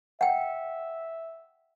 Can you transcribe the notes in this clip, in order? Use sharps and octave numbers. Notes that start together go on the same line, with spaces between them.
E5 F#5 G5